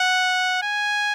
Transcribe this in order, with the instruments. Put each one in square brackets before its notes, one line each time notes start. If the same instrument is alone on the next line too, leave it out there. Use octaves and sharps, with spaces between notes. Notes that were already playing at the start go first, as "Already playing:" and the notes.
Already playing: [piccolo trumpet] F#5
G#5